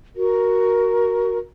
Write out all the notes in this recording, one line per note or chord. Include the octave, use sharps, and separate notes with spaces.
F#4 A#4